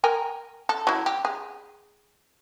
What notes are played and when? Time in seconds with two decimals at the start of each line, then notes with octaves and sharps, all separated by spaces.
0.04 A#4 G5 G#5
0.69 A4
0.87 F#3 E4
1.06 G4
1.25 G#4